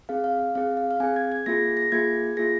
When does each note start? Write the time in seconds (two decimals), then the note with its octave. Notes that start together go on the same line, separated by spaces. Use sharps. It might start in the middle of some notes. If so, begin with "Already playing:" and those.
0.09 C4 G#4 F5
0.24 F5
0.39 F5
0.55 C4 G#4 F5
0.77 F5
0.91 F5
1.00 C4 G#4 G#5
1.16 G#6
1.32 G#6
1.46 A#3 F4 G#4 A#6
1.77 A#6
1.92 A#3 F4 G#4 G#6
2.37 A#3 F4 G#4 A#6